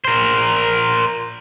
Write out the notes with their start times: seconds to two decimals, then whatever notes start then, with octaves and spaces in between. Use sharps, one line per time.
0.05 A#4 C5